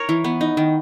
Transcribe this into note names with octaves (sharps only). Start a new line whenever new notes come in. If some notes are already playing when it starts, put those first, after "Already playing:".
Already playing: A#4 C#5
E3
B3
D#4
D#3